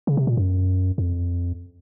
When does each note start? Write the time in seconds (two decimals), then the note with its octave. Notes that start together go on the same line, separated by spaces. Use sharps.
0.07 C#3
0.17 C3
0.27 A#2
0.37 F#2
0.98 F2